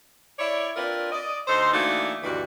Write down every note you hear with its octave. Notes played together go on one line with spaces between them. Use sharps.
E4 C#5 D5
C4 D4 F4 A#4 B4 D5
D5 D#5
D2 D#4 A4 C5
E3 A3 A#3 D4 D#4 F#4
D2 G2 D#3 E3 D4 F#4